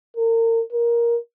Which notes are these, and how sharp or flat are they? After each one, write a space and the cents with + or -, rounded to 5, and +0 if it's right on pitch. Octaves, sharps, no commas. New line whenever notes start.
A#4 -35
A#4 +10